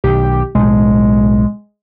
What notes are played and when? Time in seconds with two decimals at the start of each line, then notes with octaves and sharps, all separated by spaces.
0.04 B1 D#3 G4
0.55 B1 A2 G#3